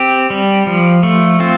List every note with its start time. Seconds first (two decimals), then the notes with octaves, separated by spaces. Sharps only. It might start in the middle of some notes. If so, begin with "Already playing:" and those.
Already playing: C4 G4
0.30 G3
0.67 F3
1.03 A3
1.40 C4 F4